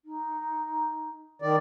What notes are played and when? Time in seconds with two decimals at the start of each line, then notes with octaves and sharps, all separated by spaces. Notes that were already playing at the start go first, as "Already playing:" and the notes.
0.05 D#4
1.42 D#3 D5